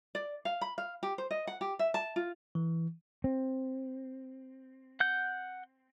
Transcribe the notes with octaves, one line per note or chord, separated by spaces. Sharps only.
D5
F5
B5
F5
G4
C5
D#5
F#5
G4
E5
A5
F4
E3
C4
F#5 G6